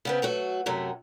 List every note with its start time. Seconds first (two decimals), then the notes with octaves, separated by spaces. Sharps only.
0.05 C#3 B3 C4
0.22 F#3 A3 F#4
0.66 F#2 C3 F#3 A3